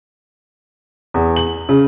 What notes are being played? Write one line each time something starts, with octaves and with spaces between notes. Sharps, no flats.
E2
F#7
C#3